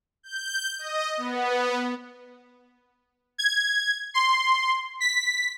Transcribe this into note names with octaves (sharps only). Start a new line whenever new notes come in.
G6
D#5
B3
G#6
C6
B6